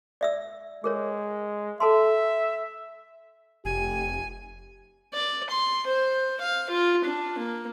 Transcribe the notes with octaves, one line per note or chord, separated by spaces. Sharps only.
D5 E5 E6
G#3 G#4 A#4 C#5
A4 E5 A5 C6
F1 G4 G#5
D5
C6
C5
F5
F4
D4
A#3